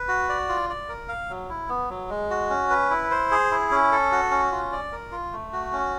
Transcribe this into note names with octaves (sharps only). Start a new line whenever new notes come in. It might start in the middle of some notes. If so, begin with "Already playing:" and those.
Already playing: B4
F#4
D5
F4
D5
A#4
F5
F#3
E4
B3
F#3
G#3
F#4
C#4
B4
E4
C5
G#4
E4
C#4
A4
F#4
C#4
F4
D5
A#4
F4
A3
F#4
C#4